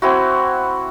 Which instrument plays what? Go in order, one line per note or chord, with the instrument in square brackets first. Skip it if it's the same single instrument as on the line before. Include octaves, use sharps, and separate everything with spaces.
[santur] C4 E4 F#4